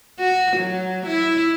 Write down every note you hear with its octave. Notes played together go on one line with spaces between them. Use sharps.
F#4
F#3
E4